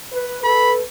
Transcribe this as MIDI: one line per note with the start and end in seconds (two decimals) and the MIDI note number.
0.12 0.42 71
0.44 0.82 69
0.44 0.82 71
0.44 0.73 83